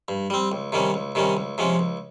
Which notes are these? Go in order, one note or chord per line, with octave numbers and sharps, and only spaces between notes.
G2
G3 C4
C#2
C3 D#3 G3 C#4
C#2
C3 D#3 G3 C#4
C#2
C3 F3 G#3 C#4
C#2